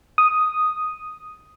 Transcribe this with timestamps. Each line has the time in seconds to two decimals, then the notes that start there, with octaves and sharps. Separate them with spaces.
0.18 D#6